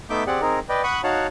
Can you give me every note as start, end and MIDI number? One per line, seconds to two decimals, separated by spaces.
0.10 0.24 57
0.10 0.24 59
0.10 0.24 63
0.10 0.24 76
0.10 0.24 86
0.10 0.24 91
0.27 0.41 60
0.27 0.41 67
0.27 0.41 68
0.27 0.41 74
0.27 0.41 78
0.41 0.59 60
0.41 0.59 63
0.41 0.59 68
0.41 0.59 70
0.69 0.82 71
0.69 0.82 74
0.69 0.82 75
0.69 0.82 79
0.84 1.01 78
0.84 1.01 83
0.84 1.01 85
0.84 1.01 87
0.84 1.01 90
1.04 1.27 63
1.04 1.27 66
1.04 1.27 73
1.04 1.27 77
1.04 1.27 78
1.04 1.27 81